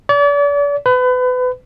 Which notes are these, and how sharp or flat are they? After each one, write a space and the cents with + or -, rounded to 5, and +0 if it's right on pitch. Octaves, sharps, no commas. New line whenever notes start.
D5 -40
B4 +30